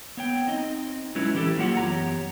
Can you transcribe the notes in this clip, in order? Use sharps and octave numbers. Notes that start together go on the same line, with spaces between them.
B3 C#5 G5
C4 D#4 D#5
F#3 G#3 C#4 E4 B4
E3 E4 G4 A4
F#3 A#3 F4 G4 F#5
F#2 E3 B3 G4 C#5 A#5